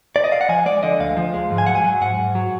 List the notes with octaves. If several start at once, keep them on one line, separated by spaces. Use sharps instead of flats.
D5
D#5
F5
F#5
F3 G#5
G#3 D5
D3 D#5
D2 F5
F3
G#3
G#2
G#5
F#3 F#5
G#5
F#3
G#2 F#5
G#2
F#3